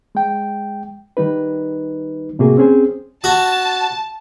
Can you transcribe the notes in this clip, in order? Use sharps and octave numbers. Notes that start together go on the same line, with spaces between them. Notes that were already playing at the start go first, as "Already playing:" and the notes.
G#3 G5
D#3 G3 D#4 B4
A2 C3 A3 A#3 F#4 G#4
C4 C#4 G#4 C5
F#4 A5